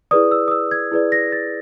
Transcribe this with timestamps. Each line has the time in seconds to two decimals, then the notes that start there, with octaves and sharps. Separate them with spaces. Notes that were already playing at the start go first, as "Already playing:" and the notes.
0.11 E4 G#4 B4 D5 D#6
0.31 E6
0.48 D#6
0.51 E6
0.71 G#6
0.91 E4 G#4 B4 D5
1.12 A#6
1.32 A6